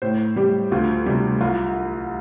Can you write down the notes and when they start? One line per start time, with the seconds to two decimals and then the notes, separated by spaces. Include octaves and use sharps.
0.02 A2 C5
0.36 G3 G4
0.72 D2 F4
1.06 C3 G3 G4
1.41 C2 F4